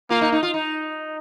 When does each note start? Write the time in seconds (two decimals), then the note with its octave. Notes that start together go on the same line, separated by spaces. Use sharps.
0.10 A#3 F4
0.21 D#4
0.32 D#4
0.43 F4
0.54 D#4